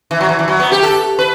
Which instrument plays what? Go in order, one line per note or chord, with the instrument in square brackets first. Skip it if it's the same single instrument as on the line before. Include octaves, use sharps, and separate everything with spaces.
[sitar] E3
F#3
E3
E3
F#3
B3
G4
A4
B4